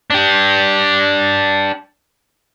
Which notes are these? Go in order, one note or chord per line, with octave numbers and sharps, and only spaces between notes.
D4 G4